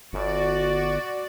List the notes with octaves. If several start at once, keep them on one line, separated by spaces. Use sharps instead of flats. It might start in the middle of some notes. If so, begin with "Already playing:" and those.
G1 F#4 D5